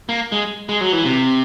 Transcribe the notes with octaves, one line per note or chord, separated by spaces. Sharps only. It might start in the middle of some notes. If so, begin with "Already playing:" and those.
A#3
G#3
G#3
F#3
E3
C3